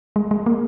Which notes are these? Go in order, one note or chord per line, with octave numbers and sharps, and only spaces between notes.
G#3
G#3
A#3